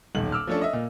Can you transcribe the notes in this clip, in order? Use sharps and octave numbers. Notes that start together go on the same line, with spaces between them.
D#1 B1 F#7
D6 E6 F6
F3 A3 C#4 D4 A4
D#5 E5
A#2